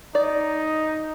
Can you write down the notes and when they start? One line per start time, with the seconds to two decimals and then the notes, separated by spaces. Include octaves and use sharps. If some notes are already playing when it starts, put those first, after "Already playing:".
0.15 D#4 D5